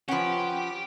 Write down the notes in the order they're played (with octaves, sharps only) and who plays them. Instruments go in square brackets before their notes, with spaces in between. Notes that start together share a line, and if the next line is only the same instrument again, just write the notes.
[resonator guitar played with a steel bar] F3 C#4 [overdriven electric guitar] G4 [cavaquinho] B4 F#5